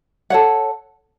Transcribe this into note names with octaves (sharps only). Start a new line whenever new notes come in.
A4 C#5 F#5